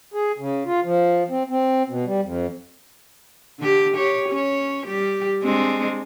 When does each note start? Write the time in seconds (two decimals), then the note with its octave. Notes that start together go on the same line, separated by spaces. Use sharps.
0.14 G#4
0.38 C#3
0.66 F4
0.84 F3
1.30 C4
1.50 C4
1.90 B2
2.06 G3
2.24 F2
3.59 D3 G4
3.96 G4 C#5
4.29 C#4 C#5
4.86 G3 G4
5.43 G#3 C4 D4